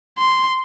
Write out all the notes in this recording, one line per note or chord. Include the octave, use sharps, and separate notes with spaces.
C6